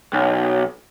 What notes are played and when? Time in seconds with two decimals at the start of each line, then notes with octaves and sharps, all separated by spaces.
0.13 B1